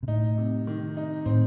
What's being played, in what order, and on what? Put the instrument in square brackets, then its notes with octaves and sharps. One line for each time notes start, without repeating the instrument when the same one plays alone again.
[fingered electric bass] C3
[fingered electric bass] A2 [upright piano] D#4
[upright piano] C3
D#3
D#4
[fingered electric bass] A2 [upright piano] C4